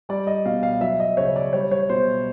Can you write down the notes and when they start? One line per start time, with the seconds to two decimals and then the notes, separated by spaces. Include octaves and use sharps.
0.09 G3 D5
0.27 D#5
0.45 B2 F5
0.63 F5
0.81 F#3 E5
1.00 D#5
1.17 C#3 C#5
1.36 D5
1.53 G3 C#5
1.71 C#5
1.89 B2 C5